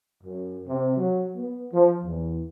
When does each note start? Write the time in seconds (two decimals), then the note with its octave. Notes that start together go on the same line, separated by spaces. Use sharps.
0.24 F#2
0.67 C3
0.97 F#3
1.36 B3
1.73 F3
2.04 E2